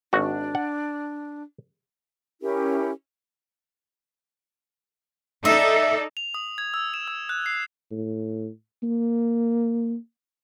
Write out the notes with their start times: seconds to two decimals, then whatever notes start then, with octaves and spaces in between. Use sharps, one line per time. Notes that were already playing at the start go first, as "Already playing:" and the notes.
0.13 G#1 D4 F#4
0.55 F#5
2.42 C#4 E4 G4 A#4
5.45 D#4 A4 D5 E5
6.17 F7
6.34 D#6
6.58 G#6
6.74 E6
6.94 E7
7.08 E6
7.29 F#6
7.46 C7
7.91 A2
8.84 A#3